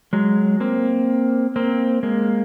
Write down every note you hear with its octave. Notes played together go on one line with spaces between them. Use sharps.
F#3 G#3
A#3 C4
A#3 C4
G#3 A#3